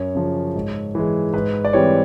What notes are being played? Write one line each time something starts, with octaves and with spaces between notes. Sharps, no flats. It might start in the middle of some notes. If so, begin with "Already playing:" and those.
Already playing: F#2 C#5
C#3 F3
G#2
E3 G#3
G#2 B4
D5
E3 G3 C4 C#5